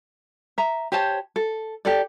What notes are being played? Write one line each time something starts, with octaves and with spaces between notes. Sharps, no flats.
E5 A#5
G4 C5 C#5 A5
A4
G4 A4 D5